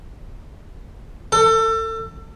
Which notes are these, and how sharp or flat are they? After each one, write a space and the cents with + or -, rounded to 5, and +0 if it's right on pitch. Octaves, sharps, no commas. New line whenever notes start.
A4 +30